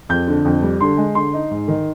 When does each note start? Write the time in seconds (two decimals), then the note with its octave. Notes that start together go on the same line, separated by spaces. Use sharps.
0.09 F2 G6
0.27 D3
0.45 F2
0.63 G3
0.81 D3 C6
0.97 G#3
1.15 D3 C6
1.33 D#4
1.51 G#2
1.68 D#3